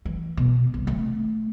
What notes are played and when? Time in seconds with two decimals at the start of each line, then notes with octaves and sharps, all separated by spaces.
0.05 E3
0.37 B2
0.74 C2
0.87 A3